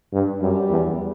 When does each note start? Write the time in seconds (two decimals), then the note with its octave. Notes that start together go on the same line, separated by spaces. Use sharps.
0.13 G2
0.41 F#2 G3
0.70 E2